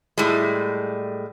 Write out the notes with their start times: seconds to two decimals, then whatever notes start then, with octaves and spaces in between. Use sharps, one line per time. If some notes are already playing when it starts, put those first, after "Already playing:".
0.17 A2 G3 G#3